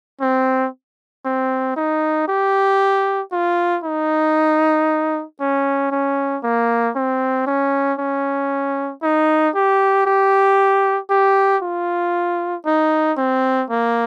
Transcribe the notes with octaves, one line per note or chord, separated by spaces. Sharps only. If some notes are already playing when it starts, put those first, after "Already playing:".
C4
C4
D#4
G4
F4
D#4
C#4
C#4
A#3
C4
C#4
C#4
D#4
G4
G4
G4
F4
D#4
C4
A#3